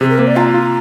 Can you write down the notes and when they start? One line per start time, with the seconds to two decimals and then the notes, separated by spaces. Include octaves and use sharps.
0.01 C3 G#4
0.09 A#4
0.18 A#3 C5
0.27 D5
0.36 F4 A#5
0.54 F4